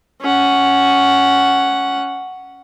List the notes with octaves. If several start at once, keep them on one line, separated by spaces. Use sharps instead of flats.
C#4 F#5